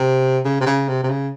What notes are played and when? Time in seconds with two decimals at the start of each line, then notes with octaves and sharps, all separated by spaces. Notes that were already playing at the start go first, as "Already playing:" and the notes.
Already playing: C3
0.45 C#3
0.60 C3
0.66 C#3
0.89 C3
1.03 C3
1.10 C#3